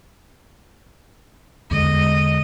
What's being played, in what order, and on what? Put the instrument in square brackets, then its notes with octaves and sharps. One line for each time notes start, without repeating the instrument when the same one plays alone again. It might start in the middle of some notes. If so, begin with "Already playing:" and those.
[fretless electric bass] E2 D3 G#3 [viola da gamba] D#5